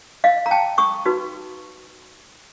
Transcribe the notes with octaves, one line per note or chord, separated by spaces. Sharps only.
D#5 F5
A#5
G5 A5
C#6 D#6
D#4 F#4 B4